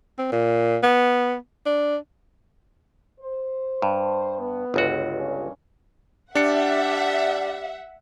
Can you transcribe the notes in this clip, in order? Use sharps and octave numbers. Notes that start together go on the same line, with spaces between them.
C4
A#2
B3
D4
C5
G2
B3
G1 C#2 F#4
G2 C#4
G3 D4 E5 F#5 C#7